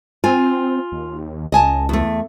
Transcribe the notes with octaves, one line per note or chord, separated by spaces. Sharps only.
C4 F4 G#5
D#2
C#2 D#5 G#5 A5
E2 A3